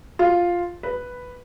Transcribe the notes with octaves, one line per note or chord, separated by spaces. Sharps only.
F4
B4